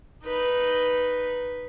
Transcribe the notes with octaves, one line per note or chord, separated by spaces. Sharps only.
D#4 B4